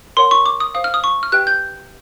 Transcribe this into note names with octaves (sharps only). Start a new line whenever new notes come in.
A#4 C#5 F#5 C6
C#6
D6
D#6
C5 F5 D#6
F6
D#6
C#6
F6
G4 B4 E5 G5 F#6
G6